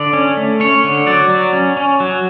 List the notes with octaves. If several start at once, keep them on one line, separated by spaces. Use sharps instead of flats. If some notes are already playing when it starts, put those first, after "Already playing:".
Already playing: D3 D5
C#4
A3
C#4 C#5
D3
F#3 D5
F#3
C#4
C#4
F#3